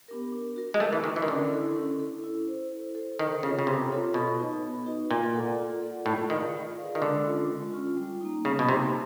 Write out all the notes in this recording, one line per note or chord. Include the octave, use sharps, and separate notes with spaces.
B3 D4 G4 A#4
D4
F#4 A#4
G#3
A3 D4
E3
D#3 F#4 A#4
E3
D#3
D3 C#4
E4 A4
C#4
E4 A4
E4
A4 C5
E4
A4 C5
D#3 D4
C#3 F4 A4 C#5
C#3
C3 D4
F4 A4 C#5
B2 B3
D#4 F#4 B4 D#5
B3
D#4 F#4 B4 D#5
A#2 F4
A4 D5 F#5
F4
A4 D5 F#5
A2 F4
D#3 G#4 B4 D5 F5
F4
G#4 B4 D5 F5
D#3
D3 G#3
C#4 F4
G#3
C#4 F4
G3
A#3 D#4
C#3 G3
B2
C3 A#3 D#4